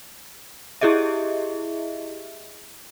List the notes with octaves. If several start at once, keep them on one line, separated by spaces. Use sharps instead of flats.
E4 G4 G#4 D#5 E5